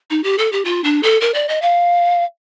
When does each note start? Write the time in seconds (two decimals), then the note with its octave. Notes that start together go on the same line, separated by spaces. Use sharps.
0.10 D#4
0.24 G4
0.38 A4
0.52 G4
0.65 F4
0.84 D4
1.03 A4
1.21 A#4
1.34 D5
1.49 D#5
1.62 F5